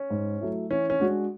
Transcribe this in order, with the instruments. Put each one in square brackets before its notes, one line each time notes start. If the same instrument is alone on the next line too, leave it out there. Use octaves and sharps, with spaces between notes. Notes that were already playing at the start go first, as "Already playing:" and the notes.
Already playing: [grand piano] C#4
[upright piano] G#2
F#3 A3 E4
[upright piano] E3 [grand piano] C#4
[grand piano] C#4
[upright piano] G#3 D4 F#4